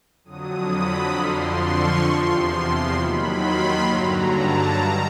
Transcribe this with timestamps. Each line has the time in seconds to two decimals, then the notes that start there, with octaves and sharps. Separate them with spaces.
0.24 F2 D3 F#3 D#6
0.69 B5
1.13 F2 D3 F3 C6
1.59 C#6
2.03 E2 C3 F3 C6
2.93 D#2 D#3 F#3 B5
3.38 C6
3.83 G2 D3 F#3 A#5
4.27 A5
4.73 G2 D#3 G3 A#5